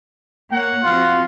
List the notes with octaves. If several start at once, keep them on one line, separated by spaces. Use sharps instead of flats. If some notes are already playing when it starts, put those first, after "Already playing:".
A#3 C#5 F#5
F3 C4 F4 F#4